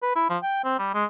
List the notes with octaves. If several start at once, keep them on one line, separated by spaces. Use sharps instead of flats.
B4
E4
F3
G5
C4
G3
G#3